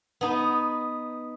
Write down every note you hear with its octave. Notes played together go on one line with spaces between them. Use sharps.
B3 D#4